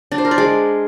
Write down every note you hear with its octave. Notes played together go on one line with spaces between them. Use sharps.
D4
C5
A#4
D5
G#3